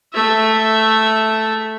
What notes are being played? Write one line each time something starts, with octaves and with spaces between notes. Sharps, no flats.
A3 E5